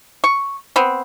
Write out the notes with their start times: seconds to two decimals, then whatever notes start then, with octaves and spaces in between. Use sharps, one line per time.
0.24 C#6
0.76 B3 C4